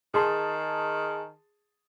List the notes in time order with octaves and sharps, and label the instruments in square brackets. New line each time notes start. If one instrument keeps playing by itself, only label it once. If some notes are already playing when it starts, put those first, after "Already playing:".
[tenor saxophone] D#3 [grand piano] G#4 A5 C6